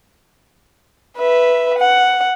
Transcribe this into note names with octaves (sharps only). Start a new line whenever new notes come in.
B4 E5
F#5